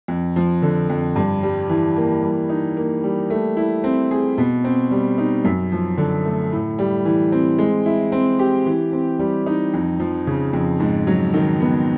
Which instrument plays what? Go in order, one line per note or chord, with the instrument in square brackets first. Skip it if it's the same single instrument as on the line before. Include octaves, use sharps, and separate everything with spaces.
[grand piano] F2
F3
D3
F2
G2
G3
E3
A#3
G3
D#4
A#3
G3
A3
E4
C4
G#4
B2
C4
G3
D#4
F#2
F3
D3
A3
A2
G3
E3
C4
G#3
E4
C4
G4
E3
C4
G3
D#4
F2
F3
C#3
F2
G#2
F#3
D#3
B3